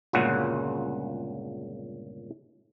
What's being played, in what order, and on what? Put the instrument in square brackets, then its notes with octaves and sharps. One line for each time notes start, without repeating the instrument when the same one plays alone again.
[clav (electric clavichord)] G1 C#2 A#2 C#3 F#4 F#5